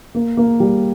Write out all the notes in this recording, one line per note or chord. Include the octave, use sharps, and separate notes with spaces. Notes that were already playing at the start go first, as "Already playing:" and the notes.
A#3
A#3
G3